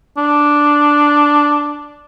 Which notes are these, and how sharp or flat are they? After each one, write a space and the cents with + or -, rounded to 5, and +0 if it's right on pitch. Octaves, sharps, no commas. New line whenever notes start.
D4 +0